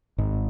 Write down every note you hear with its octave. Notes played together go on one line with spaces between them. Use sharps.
G#1 G#2